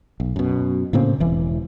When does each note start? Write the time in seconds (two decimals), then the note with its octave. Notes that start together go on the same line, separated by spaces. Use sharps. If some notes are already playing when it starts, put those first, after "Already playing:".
0.20 B1
0.36 F#2 B2
0.93 A2 C#3 A#3 C4
1.20 E1 E3